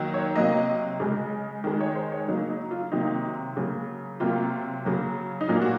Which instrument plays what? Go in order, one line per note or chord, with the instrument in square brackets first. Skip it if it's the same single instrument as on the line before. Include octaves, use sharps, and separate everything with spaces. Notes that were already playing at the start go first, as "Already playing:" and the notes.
Already playing: [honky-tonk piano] D#3 F#3 A#3
C#5
C3 F#3 A#3 D#5
C#3 G#3
D#3 G#3
C#5
C5
C#5
C#3 F#3 A#3 D#4
D#4
F4
C3 D#3 F#3 A#3 D#4
C#3 F#3 A#3
C3 F#3 A#3 F4
C#3 F#3 A#3
D#4
A#2 F#3 A#3 F4
F#4